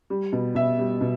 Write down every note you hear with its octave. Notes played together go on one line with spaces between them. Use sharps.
G3
B2
B2 E5
G3
B2